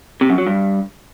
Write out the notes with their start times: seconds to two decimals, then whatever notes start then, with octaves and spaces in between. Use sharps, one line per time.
0.21 C3
0.30 F#2
0.38 F#3
0.47 G2